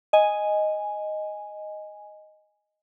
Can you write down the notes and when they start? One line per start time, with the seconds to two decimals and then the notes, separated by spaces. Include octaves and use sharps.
0.13 D#5 G#5